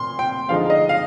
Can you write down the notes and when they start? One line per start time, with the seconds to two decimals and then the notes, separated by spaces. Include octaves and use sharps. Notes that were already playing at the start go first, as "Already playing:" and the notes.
Already playing: A#2 C6
0.19 G5
0.49 D3 F3 G#3 D#4 F5
0.70 D#5
0.89 F5